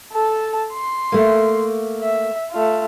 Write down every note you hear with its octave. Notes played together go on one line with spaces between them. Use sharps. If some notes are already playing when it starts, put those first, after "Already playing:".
A4 A5
C6
A3 A#3
E5
A3 F4